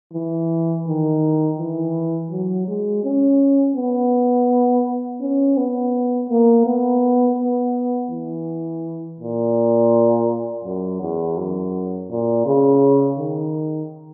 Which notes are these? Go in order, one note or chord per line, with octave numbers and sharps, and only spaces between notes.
E3
D#3
E3
F#3
G#3
C#4
B3
C#4
B3
A#3
B3
B3
E3
A#2
F#2
E2
F#2
A#2
C#3
D#3